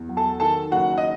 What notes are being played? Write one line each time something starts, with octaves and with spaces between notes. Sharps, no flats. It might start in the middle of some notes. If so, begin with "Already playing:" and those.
Already playing: E2
F#3
A4 A5
D#3 A4 A5
F#1 F#4 F#5
D#5